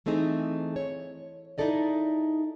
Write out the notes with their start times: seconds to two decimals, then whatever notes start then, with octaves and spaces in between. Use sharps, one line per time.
0.06 E3 A3 C4 D#4 G#4
0.76 C#5
1.58 D#4 E4 G#4 A4 D5 D#5